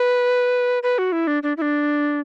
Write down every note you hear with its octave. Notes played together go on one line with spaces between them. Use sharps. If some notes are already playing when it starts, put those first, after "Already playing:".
Already playing: B4
B4
F#4
E4
D4
D4
E4
D4